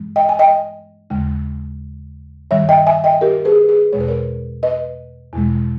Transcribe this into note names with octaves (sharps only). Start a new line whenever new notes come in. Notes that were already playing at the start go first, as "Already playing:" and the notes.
Already playing: G2 E3 G#3
D#5 G5
G#5
D#5 G5
D#2 C#3 G#3
G2 D#3 G3 C#5 E5
D#5 G5
E5 G#5
D#5 G5
G4 A#4
G#4 B4
G#4 B4
E2 B2 G#3 C#5
B4
A#4 C#5
B4 D#5
E2 B2 G#3